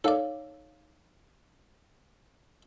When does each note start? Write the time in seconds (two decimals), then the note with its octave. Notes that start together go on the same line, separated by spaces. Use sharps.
0.04 D#4 A4 C#5 D5 F5